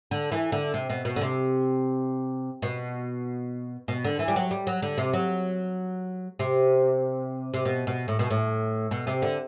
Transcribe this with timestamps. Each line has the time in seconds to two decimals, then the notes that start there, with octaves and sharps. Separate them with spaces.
0.11 D3
0.32 E3
0.52 D3
0.74 C3
0.89 B2
1.05 B2
1.16 D3
1.21 C3
2.62 B2
3.88 B2
4.05 D3
4.19 E3
4.28 G3
4.36 F#3
4.51 G3
4.67 F#3
4.82 D3
4.98 C3
5.13 F#3
6.39 C3
7.54 C3
7.65 B2
7.87 B2
8.08 A2
8.19 B2
8.30 A2
8.91 B2
9.07 C3
9.22 D3